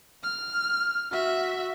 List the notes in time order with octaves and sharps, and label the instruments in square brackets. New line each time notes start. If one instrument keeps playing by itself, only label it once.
[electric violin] F6
F#4 E5